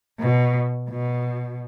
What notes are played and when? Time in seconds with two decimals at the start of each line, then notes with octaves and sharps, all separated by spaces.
0.20 B2
0.90 B2